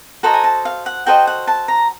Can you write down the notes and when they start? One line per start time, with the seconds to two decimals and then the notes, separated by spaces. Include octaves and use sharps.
0.23 F#4 A4 C5 D#5 A#5
0.34 G#5
0.44 A5
0.65 F5
0.86 F#5
1.06 F#4 A4 C5 D#5 G5
1.27 F#5
1.48 A5
1.68 A#5